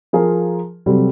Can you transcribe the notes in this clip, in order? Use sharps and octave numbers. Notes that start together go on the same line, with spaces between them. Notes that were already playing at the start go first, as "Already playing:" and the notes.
F3 F4 G#4 A#4
C3 F#3 G3 C4 A4